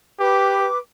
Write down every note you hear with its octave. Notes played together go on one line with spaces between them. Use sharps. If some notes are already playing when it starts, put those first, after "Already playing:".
G4 B4 D6